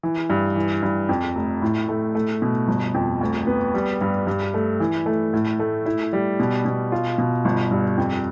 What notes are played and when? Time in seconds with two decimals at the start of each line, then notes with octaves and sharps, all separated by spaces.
0.03 E3
0.30 G2
0.56 E3
0.83 G2
1.09 F2
1.35 F1
1.62 A2
1.88 A3
2.15 A3
2.42 B2
2.68 G1
2.94 F2
3.21 D2
3.47 B3
3.74 G3
4.01 G2
4.27 G2
4.54 A3
4.80 E3
5.06 A3
5.33 A2
5.59 A3
5.86 E4
6.13 G3
6.40 B2
6.65 B2
6.92 F4
7.18 B2
7.45 G1
7.71 G2
7.97 F2